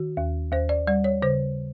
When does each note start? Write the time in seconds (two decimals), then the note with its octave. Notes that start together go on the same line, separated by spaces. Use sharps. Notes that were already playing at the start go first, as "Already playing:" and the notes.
Already playing: D#3 F#4
0.17 D#2
0.52 D#2 C5
0.69 D5
0.87 G3 D5
1.04 C#5
1.22 C#3 C5